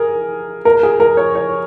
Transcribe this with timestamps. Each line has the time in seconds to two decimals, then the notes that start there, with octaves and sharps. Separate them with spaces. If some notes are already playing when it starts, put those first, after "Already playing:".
Already playing: G#4 A#4
0.65 A#4
0.83 G#4
1.00 A#4
1.17 C#5
1.35 C#5